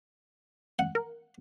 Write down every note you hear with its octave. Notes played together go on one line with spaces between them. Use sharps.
F#5
A#4